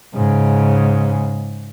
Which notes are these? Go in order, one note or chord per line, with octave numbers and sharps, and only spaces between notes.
G#2 C#3